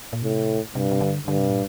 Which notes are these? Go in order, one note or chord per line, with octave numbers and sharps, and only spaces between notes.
A#2
A2 C3
G2 C3
C3
D3
G2 D3
C3
A#2